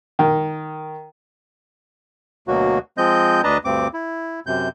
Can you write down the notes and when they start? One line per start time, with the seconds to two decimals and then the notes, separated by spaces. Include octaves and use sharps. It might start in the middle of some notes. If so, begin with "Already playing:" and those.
0.19 D#3
2.48 D2 B2 F#3 A#3 F#4
2.98 F3 G#3 C4 D#5 G6
3.44 D2 D4 B4 D#5 A5 A#5
3.65 D2 G2 C4 D6
3.94 E4
4.46 F#2 C3 G6